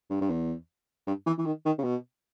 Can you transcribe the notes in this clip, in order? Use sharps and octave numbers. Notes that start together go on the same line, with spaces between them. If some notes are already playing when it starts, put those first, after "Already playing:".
G2
G2
E2
G2
E3
E3
D#3
D#3
C#3
B2